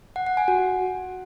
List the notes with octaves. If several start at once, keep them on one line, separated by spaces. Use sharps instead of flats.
F#5
F#5
G#5
F#4